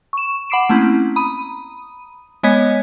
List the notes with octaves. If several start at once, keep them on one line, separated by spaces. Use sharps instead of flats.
C#6 E7
F#5 B5 D6 C7 D7 E7
A3 A#3 C4 C#4 E4
A#5 B5 D#6 D#7
G#3 B3 C#5 D#5 G#6 B6